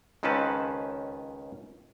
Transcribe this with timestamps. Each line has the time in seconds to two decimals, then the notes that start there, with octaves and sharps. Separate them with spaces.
0.23 C#2 D#3 C4 C#4 B4 A5